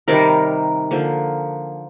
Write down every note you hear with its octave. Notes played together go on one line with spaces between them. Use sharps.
C3 D#3 G3 A#4 D5
D3 F3 A#3